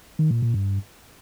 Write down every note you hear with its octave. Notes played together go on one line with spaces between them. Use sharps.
D#3
A#2
A#2
G2